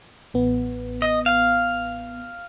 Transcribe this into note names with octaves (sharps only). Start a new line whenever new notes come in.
A1 B3
D#5
F5